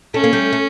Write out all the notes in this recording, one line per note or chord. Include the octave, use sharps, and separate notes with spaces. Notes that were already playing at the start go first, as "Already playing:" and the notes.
A3 C#4
A#3
G3 A3
A3